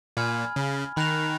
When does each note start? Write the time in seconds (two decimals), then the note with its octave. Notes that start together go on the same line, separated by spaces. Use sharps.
0.17 A#2 G#5 B5 F6 G#6 C#7
0.56 C#3
0.96 D#3 B5 F#6 A#6 F7